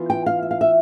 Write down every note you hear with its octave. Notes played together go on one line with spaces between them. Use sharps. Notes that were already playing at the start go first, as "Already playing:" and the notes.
Already playing: E3 B3 F4
G5
F5
E5
F5
E5